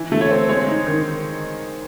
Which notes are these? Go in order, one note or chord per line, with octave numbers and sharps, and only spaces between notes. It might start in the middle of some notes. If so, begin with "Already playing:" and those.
Already playing: E3
A3
C#5
C4
G#3 C#5
D#4
D#3